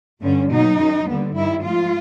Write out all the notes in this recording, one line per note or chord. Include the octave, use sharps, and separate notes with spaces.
G2 D3 G3 C#4
B2 F#3 A#3 D#4
F#2 D#3 F#3
D#2 D3 G3 B3
G2 D#3 G3 E4
G#2 F3 A3 F4